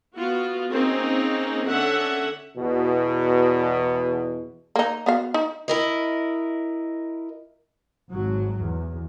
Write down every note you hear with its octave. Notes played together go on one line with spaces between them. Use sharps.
B3 F4 F#4
A#3 C4 C#4 D#4 G#4
D3 C#4 E5 F#5
E2 B2
A#3 D#4
B3 F#4 F5
D#4
E4 A#4 D#5
G#1 F#3
E2